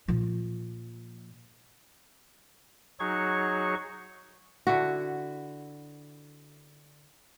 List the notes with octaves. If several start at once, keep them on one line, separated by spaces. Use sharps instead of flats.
A#2 F3
F#3 D#4 F#4 G#4 C#5 C#6
D3 E4 F#4